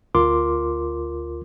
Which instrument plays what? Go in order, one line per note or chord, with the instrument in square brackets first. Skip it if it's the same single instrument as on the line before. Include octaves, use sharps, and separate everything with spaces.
[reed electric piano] D2 F4 A#4 C6 D6